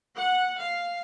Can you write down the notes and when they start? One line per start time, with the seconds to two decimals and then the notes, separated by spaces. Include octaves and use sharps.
0.17 F#5
0.60 F5